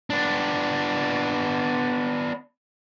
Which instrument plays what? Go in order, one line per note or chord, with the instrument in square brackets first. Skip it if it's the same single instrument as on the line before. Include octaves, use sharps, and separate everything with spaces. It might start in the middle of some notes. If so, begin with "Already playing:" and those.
[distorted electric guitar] B3 D4